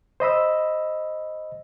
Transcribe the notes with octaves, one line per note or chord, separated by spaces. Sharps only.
C5 D#5 B5 E6